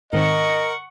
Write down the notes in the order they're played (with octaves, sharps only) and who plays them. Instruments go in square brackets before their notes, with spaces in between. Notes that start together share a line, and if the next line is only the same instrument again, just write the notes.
[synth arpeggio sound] G#2 D#3 C4 [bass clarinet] A#4 [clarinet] D#5 [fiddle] F#5 C#6